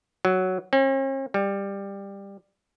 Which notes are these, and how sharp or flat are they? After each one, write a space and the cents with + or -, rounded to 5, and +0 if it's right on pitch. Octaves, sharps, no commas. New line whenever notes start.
F#3 +5
C#4 -45
G3 +15